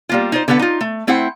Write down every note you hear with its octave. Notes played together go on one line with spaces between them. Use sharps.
G3 A#3 F4
D#4 F4 C5
D3 B3 A4 B4 F#5
D#4 F4
A3
A3 C4 E4 C5 F#5